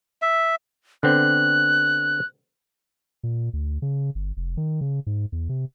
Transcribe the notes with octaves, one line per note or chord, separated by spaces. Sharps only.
E5
D3 B3 C4 F#6
A#2
D2
C#3
G1
F1
D#3
C#3
G#2
E2
C3